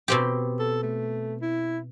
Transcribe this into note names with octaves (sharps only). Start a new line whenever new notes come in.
B2 C4 G4
A4
A3
E4